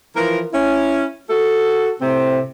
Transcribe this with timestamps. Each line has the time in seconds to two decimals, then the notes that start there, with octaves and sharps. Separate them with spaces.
0.16 E3 F3 A#4
0.53 C#4 E4
1.30 F#4 A4
2.01 A2 C3 C4